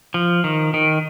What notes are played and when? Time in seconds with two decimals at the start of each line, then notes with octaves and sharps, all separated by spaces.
0.14 F3
0.44 D#3
0.74 D#3